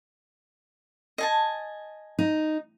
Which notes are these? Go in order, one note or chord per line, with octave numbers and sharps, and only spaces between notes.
D#5 G#5 A5
D#4